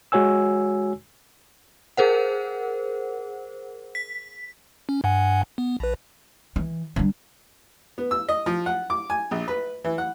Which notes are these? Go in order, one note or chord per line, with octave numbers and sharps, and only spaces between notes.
G#3 F#4 C#5 G#5 E6
G#4 A#4 C5 F#5
B6
C#4
G2 F#5 G#5
B3
A#1 B4
E3
D3 G3
B3
E6
D#5
F3
F#5
D6
G#5
A#1
B4
E3
F#5